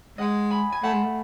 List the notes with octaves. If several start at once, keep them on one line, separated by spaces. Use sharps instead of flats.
G#3 D#5 F#5
G#5 B5
G#5
A3 F#5 A5
G#3
A3